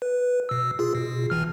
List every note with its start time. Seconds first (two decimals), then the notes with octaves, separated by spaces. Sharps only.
0.02 B4
0.49 B2 E6
0.79 F4 G#4
0.95 B2
1.30 G#1 E3 F6